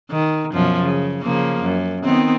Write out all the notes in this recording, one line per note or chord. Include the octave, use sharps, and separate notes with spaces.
D#3
F#2 B2 F3
C#3
C#3 F3 A#3
F#2
D#3 B3 C4